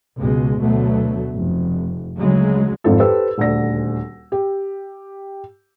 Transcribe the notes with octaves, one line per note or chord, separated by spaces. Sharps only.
C#2 B2 G#3
D2 B2 F#3 A3
F1
D2 C#3 F#3 G#3
G#1 F2 F4 A4
G4 A4 B4 C5 E6
D#1 D2 D5 A#6
G4